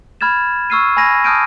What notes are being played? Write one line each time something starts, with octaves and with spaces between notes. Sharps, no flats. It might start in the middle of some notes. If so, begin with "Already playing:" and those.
B5 F6 G#6 A6 E7
C#6 E6 F6 C7 D#7
G#5 B5 G#6 A#6 D#7
A5 D#6 F6 G6 D7 D#7